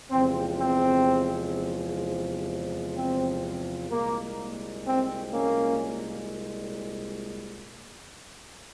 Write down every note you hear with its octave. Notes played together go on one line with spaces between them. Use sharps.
E2 C3 F3 G#3 C4
C4
C4
C2 A#2 G#3 A#3
C4
A#3 C#4